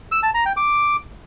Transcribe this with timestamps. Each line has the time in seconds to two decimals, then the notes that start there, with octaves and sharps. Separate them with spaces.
0.12 E6
0.23 A5
0.34 A#5
0.45 G5
0.57 D6